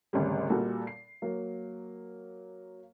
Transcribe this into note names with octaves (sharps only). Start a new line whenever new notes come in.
G#1 D2 C#3 G3
A#2 G3 F#4 A4
C7
F#3 A#3